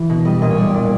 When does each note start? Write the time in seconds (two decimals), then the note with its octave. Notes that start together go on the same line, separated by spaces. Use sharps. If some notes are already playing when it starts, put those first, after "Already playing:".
Already playing: E3
0.10 B2
0.25 G3 D#5
0.41 A#2 D#5
0.51 C#5
0.58 G3 D5
0.74 A#2 D5